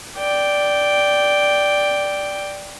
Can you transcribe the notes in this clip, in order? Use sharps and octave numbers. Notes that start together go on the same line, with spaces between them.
D5 G5